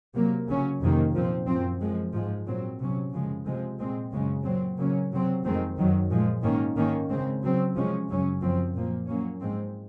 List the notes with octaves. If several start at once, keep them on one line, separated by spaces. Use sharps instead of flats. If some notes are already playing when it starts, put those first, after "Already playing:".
C3 F#3 A#3
C#3 F#3 C#4
F2 C3 D#3 A#3
A#2 F3 C4
F#2 F3 C4
F#2 F3 G#3
G#2 F3 G#3
A#2 F#3 C4
C3 F#3 C#4
F#2 C#3 F3 G#3
C3 F3 G#3 C4
A#2 G#3 C4
F#2 C#3 G#3 C#4
A#2 F#3 C4
C#3 F#3 A#3 C#4
C3 F#3 C4
F2 D#3 G#3 C4
F#2 D#3 F#3
A#2 F3 G#3
G#2 D#3 A#3 C#4
G#2 D#3 A#3 C#4
C#3 G#3 C4
C#3 F#3 C4
C3 F3 G#3 C#4
F#2 C#3 F#3 C#4
F#2 F3 C4
A#2 F3 A#3
A#2 F#3 A#3 C#4
G#2 F3 G#3 C4